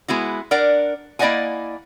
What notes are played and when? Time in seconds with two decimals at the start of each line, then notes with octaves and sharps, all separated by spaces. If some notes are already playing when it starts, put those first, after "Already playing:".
0.08 G#3 B3 E4 F#4
0.51 D4 A#4 D5 F#5
1.19 A#3 E4 D5 D#5 F#5 G#5